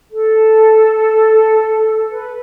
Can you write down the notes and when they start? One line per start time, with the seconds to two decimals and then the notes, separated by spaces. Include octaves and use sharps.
0.11 A4
2.11 B4